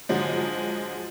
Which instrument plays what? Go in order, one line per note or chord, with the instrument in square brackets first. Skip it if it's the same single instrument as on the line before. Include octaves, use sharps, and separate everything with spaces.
[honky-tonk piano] G#2 D3 F3 F#3 G#3